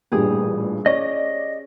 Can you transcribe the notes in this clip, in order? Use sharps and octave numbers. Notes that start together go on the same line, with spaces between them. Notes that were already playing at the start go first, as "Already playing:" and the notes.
A1 G2 A#2 G4 G#4 D#6
C#4 D5 D#5 A#6